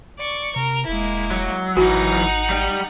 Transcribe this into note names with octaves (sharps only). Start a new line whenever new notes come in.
D5 C#6
C3 A#4
E1 G#3 A#3 E4
F#3
G#1 E3 F#3 D#4 F#4 F#5
G3 G5